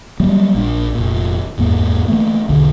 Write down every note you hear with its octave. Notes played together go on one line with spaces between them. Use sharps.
F#3 G3 A#3
A#1 D4
F1 A#2
F#1 E2 G#2 A#3
E3 A3 A#3
E1 B1 D3